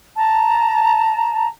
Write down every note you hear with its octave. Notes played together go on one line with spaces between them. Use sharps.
A5 A#5